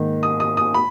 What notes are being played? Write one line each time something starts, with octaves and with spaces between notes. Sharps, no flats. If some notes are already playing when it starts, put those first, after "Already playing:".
Already playing: G#2 D#3 A#3 D#4
D#6
D#6
D#6
B5